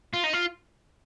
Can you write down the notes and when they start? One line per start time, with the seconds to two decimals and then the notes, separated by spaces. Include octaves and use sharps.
0.13 F4
0.24 D#4
0.33 F4